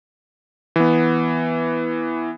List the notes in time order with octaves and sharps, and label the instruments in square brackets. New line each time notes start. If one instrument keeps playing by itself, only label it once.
[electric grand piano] E3 B3